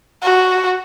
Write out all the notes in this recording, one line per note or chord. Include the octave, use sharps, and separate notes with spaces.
F#4